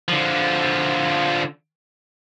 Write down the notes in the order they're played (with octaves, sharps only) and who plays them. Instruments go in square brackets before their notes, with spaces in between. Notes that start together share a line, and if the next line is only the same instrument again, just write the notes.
[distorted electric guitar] D3 F3